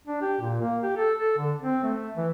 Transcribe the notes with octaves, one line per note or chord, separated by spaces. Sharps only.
D4
G4
A#2
A#3
G4
A4
A4
D3
C4
A3
E3